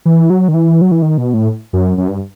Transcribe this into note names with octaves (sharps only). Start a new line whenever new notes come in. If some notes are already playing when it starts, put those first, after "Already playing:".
E3
F#3
D#3
E3
F#3
E3
D#3
B2
A2
F#2
F#2
G2